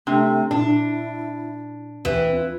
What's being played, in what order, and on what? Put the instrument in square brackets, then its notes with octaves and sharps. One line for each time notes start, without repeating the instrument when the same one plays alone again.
[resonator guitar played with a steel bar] C3 [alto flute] A3 [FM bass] D4
[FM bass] A#2 [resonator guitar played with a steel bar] D4 [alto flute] E4
[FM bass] D#2 [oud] E3 [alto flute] C4
[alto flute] F4